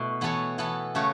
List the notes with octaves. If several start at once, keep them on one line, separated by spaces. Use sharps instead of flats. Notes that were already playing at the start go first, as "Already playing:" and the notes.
Already playing: B2 A3 E4
E3 B3 A4 C#5
E3 B3 A4
C#3 A3 F#4 C#5